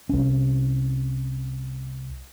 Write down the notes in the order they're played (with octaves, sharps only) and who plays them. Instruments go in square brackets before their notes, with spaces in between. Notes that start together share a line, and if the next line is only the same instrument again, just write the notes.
[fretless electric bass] C2 C#4